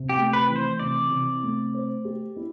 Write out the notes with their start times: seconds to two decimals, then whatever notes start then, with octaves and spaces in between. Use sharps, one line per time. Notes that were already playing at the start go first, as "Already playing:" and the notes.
Already playing: C3
0.09 G4
0.17 A3
0.33 B4
0.49 E3
0.56 C5
0.80 C3 D5
1.11 C3
1.43 A3
1.74 C5
2.05 G4
2.36 E4